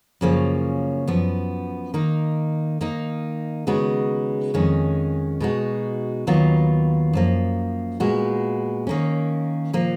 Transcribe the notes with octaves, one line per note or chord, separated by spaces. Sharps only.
F#2 C#3 F3 A#3 C#4
F#2 F3 B3
D#3 A#3 D#4
D#3 A#3 D#4
C#3 G#3 B3 D#4 F#4
F2 D#3 G#3 C#4
B2 G#3 D#4 F#4
D#2 D#3 F#3 B3 F4
F#2 F3 A#3
A#2 G#3 B3 F#4
D#3 A#3 C#4
A#2 F3 A#3